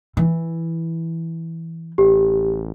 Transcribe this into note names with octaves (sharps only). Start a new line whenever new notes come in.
E3
A1 G4